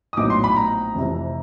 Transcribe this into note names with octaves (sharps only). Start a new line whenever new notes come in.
D#6
A#1 A2 F#3 B3 D#4 D6
C6
B5
A#5
F1 F2 C3 E3